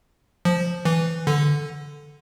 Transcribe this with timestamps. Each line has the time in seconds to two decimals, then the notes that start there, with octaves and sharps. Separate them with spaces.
0.45 F3
0.85 E3
1.27 D3